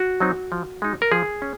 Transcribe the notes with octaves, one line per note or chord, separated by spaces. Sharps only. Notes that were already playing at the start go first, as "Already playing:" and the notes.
Already playing: F#4
F#3 C4 D#4
F3
G#3 D#4
A#4
F3 G#4
C#4